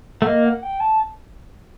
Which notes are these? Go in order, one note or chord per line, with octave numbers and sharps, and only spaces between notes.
A3 F#5
A#3 D#5
F#5
G5
A5